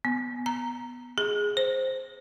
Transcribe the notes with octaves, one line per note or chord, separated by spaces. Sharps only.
B3
A#5
G#4
C5